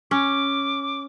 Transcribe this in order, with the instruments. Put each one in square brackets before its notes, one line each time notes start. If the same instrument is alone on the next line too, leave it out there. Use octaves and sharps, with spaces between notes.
[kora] C#4 [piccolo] D6